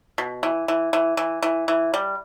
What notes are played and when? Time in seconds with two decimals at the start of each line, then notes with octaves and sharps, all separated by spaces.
0.18 B2
0.43 E3
0.68 E3
0.93 E3
1.17 E3
1.42 E3
1.68 E3
1.94 G3